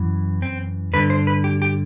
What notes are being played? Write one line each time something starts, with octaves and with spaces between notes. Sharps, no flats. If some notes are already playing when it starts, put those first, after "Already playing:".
Already playing: F#2 E3
C4
G2 D3 B4
C5
B4
G4
G4